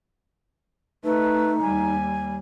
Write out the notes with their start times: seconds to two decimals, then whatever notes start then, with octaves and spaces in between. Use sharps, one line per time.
1.04 A3 D#4 B4
1.61 D#2 G3 G#5